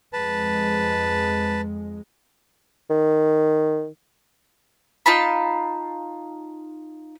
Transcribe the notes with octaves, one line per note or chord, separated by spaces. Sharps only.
F2 G#3 B4 A5
D#3
D#4 F4 A5 B5